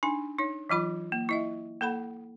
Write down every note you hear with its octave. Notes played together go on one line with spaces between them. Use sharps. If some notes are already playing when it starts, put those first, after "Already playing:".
D4 D#4 G#5
D#4 C#5
E3 F#3 F4 B5
A#3
E4 D#5 E5
A#3 A4 F#5 B5